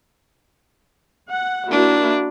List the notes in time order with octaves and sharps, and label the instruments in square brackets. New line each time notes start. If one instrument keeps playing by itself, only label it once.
[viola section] F#5
[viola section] A#3 E4 F#4 [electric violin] D4